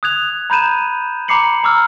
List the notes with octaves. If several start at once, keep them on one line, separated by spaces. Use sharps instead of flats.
D#6 F#6 G#6 F7
A#5 B5 G6 D#7 E7
A#5 B5 D6 C7 C#7 F#7
A#5 D6 E6 F6